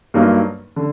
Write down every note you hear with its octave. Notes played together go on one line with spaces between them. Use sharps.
G2 F#3 A#3 D#4
D3